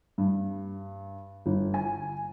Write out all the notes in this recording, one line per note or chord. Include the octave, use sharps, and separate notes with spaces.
G2
G1
G#5